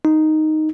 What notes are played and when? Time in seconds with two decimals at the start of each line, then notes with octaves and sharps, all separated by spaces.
0.05 D#4